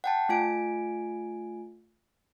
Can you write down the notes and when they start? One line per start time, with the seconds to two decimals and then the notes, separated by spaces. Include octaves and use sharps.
0.04 F#5 G5 A5
0.29 A3 F4 G#5 D7